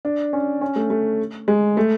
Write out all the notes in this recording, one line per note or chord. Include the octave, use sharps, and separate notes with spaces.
D4
C#4
C#4
A3
A3
G#3
A3